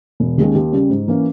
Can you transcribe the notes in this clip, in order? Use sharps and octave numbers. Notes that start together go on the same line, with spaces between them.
E1
D#2 D#3 G#3 C#4
D#2
C#3 G3 C#4
G#2
E3 A#3 C#4